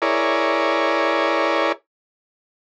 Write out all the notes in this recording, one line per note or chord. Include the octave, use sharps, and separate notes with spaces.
E4 G#4 A#4 C#5 D5